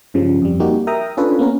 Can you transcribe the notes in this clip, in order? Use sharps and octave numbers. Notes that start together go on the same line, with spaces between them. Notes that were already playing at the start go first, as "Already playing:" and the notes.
G2 C#3 F3 G3
F2 G3
G3 A#3 D#4 F#4 G4
A#4 E5 G5 A#5 D#6
C#4 D4 F4 A4 B4 C#5
A#3 B3 C#4 A#4